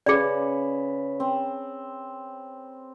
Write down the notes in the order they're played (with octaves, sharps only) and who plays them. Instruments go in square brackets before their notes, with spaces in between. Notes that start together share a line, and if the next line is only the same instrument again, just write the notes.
[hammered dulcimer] C#3 B4 [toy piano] G#4 D5
[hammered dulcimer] C4